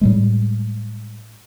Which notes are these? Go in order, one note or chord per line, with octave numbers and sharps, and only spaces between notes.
A2 G3 G#3